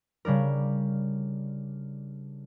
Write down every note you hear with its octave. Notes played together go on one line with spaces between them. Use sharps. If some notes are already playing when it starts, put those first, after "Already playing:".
C#3 G3 D4 A#4